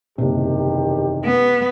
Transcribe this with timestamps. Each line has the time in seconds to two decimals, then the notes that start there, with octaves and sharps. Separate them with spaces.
0.18 F#1 E2 C3 D#3 G4
1.25 B3